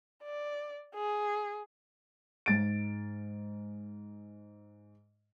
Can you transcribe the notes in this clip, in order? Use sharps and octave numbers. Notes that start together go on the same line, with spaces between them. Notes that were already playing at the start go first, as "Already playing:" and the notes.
D5
G#4
G#2 A6 D7